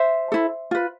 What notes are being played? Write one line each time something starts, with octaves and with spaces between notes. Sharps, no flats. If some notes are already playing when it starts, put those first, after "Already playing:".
Already playing: C5 E5
E4 A4
F4 B4